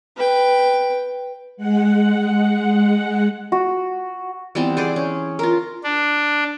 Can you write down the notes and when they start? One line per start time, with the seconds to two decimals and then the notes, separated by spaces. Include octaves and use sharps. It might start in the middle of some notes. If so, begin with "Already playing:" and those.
0.16 B4 G5
1.57 G#3 F#5
3.52 F#4
4.55 E3 G3 B3 C4
4.77 G#4 C5 D5
4.96 C#4
5.39 F4 A#4
5.84 D4